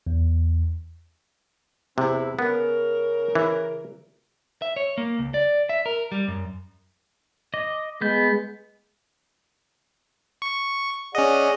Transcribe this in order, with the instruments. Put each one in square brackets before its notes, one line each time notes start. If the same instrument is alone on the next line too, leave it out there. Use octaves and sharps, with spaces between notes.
[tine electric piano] E2
[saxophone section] E2 C4 E4 [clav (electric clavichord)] C3
[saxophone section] C#3 A#4 [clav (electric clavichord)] B3
[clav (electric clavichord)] E3
[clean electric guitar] E5
C#5
A#3
C#2
D5
E5
A#4
G3
F#2
[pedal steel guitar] D#5 D6
[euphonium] G#3 [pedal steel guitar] B3 G6
[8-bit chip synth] C#6
[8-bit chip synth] C#4 D#5 [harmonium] G#4 D5 F#5